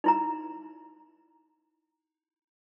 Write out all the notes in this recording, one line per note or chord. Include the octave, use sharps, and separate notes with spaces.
D#4 E4 A#5